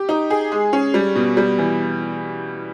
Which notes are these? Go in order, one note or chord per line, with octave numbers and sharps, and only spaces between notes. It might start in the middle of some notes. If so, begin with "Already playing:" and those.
Already playing: G4
D#4
G#4
G#3
C#4
G3
B2
G3
E3